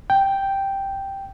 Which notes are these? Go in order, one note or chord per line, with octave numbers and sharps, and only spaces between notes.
G5